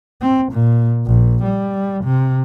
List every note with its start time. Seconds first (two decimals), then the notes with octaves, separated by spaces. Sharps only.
0.22 C4
0.52 A#2
1.06 A#1
1.43 G3
2.04 C3